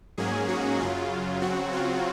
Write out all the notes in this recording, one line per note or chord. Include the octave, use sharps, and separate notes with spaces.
G#2 F#3 A#3 C#4 G#4
F#4
F#2 C#3 F#3 F4
C#3 F#3 C4 F#4
F4